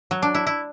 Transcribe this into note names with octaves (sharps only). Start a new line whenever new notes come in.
F#3
D4
E4
E4